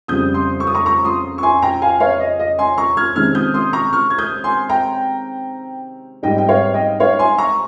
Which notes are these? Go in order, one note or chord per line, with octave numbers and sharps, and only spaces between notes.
F2 C#3 G3 D#6 G6
C6 D#6
C#6
D#6
A#5 C#6
A#5 C#6
C6 D#6
C#6
G#5 C6
G5 A#5
F5 G#5
C#5 F5
D#5
D#5
G#5 C6
A#5 C#6
F6 G#6
C3 D#3 G#3 C#4 F6 G#6
D#6 G6
C6 D#6
A#5 C#6
C#6 F6
G#6
D#6 G6
G#5 C6
G5 A#5
G#2 G3 C4 D#4 D#5 G5
G5
C#5 F5
D#5 G5
C#5 F5
G#5 C6
A#5 C#6